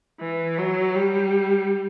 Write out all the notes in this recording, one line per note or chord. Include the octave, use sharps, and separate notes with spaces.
E3
F#3
G3